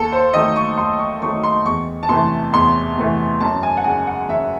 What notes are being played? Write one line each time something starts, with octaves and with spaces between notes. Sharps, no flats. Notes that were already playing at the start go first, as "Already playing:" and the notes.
Already playing: D#2 A4
C5
D#3 F#3 A3 D#5
C#6
D#2 C6
C#6
D#3 F#3 A3 C#6
C6
E2 C#6
A5
C3 E3 A3 C6
E2 C6
C3 E3 A3
F#2 A5
G#5
F#5
C#3 G#3 G#5
F#5
F#2 E5